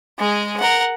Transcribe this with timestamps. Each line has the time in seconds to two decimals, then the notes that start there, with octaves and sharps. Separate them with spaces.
0.19 G#3 G#4
0.60 A#4 F#5